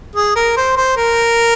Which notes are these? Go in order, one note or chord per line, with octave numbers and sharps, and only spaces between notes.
G#4
A#4
C5
C5
A#4